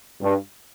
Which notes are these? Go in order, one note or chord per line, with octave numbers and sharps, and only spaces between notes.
G2